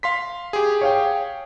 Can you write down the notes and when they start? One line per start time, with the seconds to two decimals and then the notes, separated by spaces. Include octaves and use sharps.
0.03 F5 C6 B6
0.53 G4 G#4
0.81 C#5 F5 G5